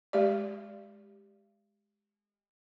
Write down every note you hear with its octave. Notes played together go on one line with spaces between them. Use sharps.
G#3 G4 D5